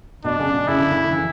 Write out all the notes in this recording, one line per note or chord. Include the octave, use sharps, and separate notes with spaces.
B2 D4
C#3
B2
C#3 E4
D3
C#3
D3
E3